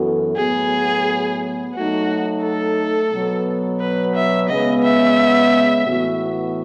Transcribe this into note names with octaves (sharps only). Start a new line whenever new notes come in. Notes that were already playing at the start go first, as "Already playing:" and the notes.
Already playing: F#2 E3 B3 F#4 A4
A2 F#3 B3 G#4
F#3 A3 D#4 F#4
A4
B2 F#3 B3
B4
E5
C#3 G#3 B3 D#5
E5
A2 E3 B3 F#4